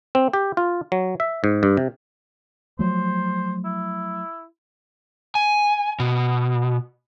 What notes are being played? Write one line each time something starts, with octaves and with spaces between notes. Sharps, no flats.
C4
G4
F4
F#3
E5
G#2
G2
C3
F3 F#3 A3 C5
E4
G#5
B2